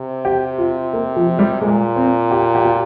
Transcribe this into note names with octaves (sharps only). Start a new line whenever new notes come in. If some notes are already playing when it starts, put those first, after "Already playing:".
Already playing: C3
G4
F4
A#3
F3
G3
A#2 G#3
C4
G4
G4
F4